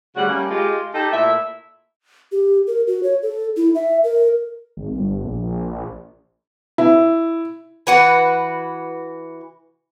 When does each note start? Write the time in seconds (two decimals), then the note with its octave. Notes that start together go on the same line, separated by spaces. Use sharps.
0.15 D2 C#3 G3 F#4 D5 F#5
0.28 G3 A3 A#3 C#4
0.50 G#3 F4 G4
0.93 D#4 G4 A4
1.12 A#2 A3 E4 E5
2.32 G4
2.67 A#4
2.87 F#4
3.03 C#5
3.22 A4
3.57 E4
3.75 E5
4.04 A#4
4.77 G#1
4.96 G1
5.24 A#1
6.78 E4
7.87 E3 F#4 B4